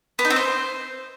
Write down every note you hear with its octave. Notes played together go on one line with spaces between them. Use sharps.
B3
D#4
C4
C5